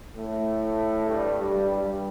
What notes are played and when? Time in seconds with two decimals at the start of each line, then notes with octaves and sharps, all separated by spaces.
0.17 A2 A3
1.08 G2 G3
1.39 G2 G3
1.69 G2 G3